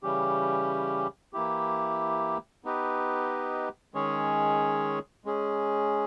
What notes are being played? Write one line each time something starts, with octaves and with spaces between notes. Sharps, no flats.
C#3 E3 G3 C#4 G4
E3 A#3 E4 G4
B3 D#4 G4 B4 D#5
D#3 G#3 C#4 G#4 C#5
G#3 C#4 G#4